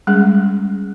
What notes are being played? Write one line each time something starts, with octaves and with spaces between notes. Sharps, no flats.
G3 G#3 C#4 G#4